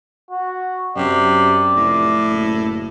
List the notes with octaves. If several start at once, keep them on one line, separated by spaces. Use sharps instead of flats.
F#4
F#2 C3 D5
F1 A2
F#1